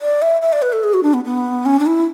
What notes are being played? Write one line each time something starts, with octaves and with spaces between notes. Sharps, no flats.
D5
E5
E5
D5
B4
A4
G#4
F#4
D4
B3
B3
C#4
D4
E4